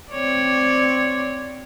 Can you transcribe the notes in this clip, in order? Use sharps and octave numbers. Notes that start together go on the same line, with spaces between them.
C4 C#5 D5